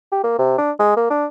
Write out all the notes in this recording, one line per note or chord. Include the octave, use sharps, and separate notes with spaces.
G4
A#3
C3
D4
G#3
A#3
D4